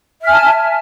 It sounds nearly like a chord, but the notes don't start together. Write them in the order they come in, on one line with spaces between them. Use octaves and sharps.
E5 F6 G#5 A5